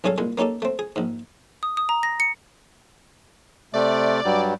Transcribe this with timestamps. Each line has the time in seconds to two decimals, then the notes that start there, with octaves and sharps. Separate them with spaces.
0.04 B1 G2 C#4 G#4 A4 F5
0.18 C2 A#2 G#3
0.38 A#3 C#4 D#4 G4 A4
0.62 A3 C4
0.79 G#4
0.96 A#1 G#2
1.63 D#6
1.77 D#6
1.89 A#5
2.03 A#6
2.20 C#7
3.74 C3 A3 D5
4.25 G2 F#3 G3